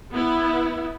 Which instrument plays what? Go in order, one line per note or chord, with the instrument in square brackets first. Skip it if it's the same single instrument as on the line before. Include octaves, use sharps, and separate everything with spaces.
[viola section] B3 E4